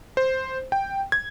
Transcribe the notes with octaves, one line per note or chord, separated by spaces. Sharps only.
C5
G5
G#6